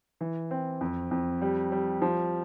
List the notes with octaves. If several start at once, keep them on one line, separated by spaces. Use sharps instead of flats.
E3
C4
F2
F2
G3
G3
F3